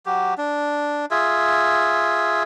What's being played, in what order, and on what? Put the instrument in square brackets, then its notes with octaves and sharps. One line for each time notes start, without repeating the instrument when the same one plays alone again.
[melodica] F#3 G4
D4
F4 G#4 E5